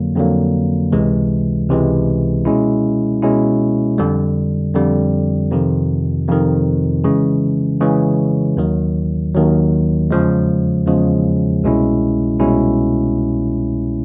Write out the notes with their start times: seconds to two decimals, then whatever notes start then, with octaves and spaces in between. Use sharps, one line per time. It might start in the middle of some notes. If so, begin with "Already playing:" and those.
Already playing: F2 D3 F#3 A#3
0.16 F2 D3 F#3 A#3
0.92 C#2 C3 E3 G#3
1.69 C#2 C3 E3 G#3
2.45 B2 G#3 C#4 E4
3.22 B2 G#3 C#4 E4
3.98 F2 D3 G3
4.75 F2 D3 G3
5.51 F2 C3 D#3
6.28 F2 C3 D#3
7.04 C#3 E3 G#3 C#4
7.81 C#3 E3 G#3 C#4
8.57 D#2 D#3 F#3
9.35 D#2 D#3 F#3
10.11 E2 C#3 F3 G#3
10.87 E2 C#3 F3 G#3
11.64 C2 B2 G#3 C#4 E4
12.40 C2 B2 G#3 C#4 E4